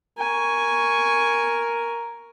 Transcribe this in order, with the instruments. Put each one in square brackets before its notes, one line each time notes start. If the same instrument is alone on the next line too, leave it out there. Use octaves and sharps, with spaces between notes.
[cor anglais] A#4 [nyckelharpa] G#5 C#6